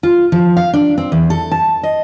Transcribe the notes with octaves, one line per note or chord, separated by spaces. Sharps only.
F4
F3
F5
D4
C4
E2
A4
A5
D#5